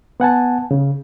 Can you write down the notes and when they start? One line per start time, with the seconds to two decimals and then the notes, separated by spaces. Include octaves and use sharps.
0.20 B3 F#5 G#5 A5
0.71 C#3